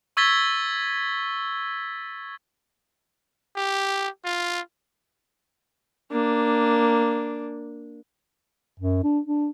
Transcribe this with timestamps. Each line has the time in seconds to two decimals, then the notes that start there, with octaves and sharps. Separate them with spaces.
0.17 C#6 E6 G#6 A6 B6 G7
3.56 G4
4.25 F4
6.12 A#3 D4
8.80 F#2
9.04 D4
9.26 D4